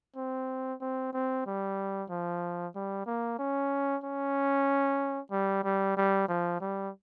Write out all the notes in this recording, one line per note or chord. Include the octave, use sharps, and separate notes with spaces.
C4
C4
C4
G3
F3
G3
A#3
C#4
C#4
G3
G3
G3
F3
G3